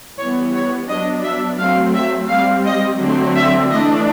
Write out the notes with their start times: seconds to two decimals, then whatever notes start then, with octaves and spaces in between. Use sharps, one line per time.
0.18 E3 G3 B3 C#5
0.53 C#5
0.89 F#3 B3 D4 D#5
1.24 E5
1.59 F#3 A3 C4 F5
1.94 E5
2.29 G3 C4 F5
2.65 D#5
3.00 D3 F#3 A3 C4
3.35 E5
3.70 E3 A3 D4 D#5